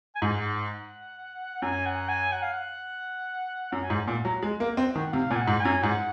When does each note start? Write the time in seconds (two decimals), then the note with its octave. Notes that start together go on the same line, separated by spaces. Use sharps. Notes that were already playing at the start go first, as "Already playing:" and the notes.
0.15 G#5
0.22 G#2 F#5
1.62 F#2 G#5
1.86 F#5
2.09 G#5
2.32 F#5
2.43 F5
2.52 F#5
3.72 F#2 F#5
3.82 G#5
3.90 G#2 F#5
4.07 A#2
4.25 F#3
4.43 G#3
4.60 A#3
4.77 C4
4.95 D#3
5.12 C3 F5
5.30 A#2 G#5
5.36 F#5
5.47 G#2
5.60 G#5
5.65 F#2
5.83 G#2 F#5